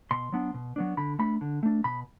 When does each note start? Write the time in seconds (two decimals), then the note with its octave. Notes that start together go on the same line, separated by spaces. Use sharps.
0.11 B2 C6
0.32 F#3 B3 D4
0.54 B2
0.76 F#3 B3 D4
0.97 D3 B5
1.19 A3 D4 B5
1.41 D3
1.63 A3 D4
1.84 B2 B5